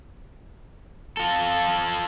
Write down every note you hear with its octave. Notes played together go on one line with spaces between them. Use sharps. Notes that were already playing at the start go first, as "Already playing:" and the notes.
F4 A4